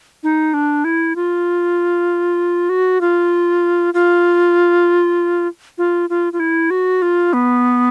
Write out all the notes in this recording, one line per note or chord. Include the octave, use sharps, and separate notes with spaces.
D#4
D4
E4
F4
F#4
F4
F4
F4
F4
F4
E4
F#4
F4
B3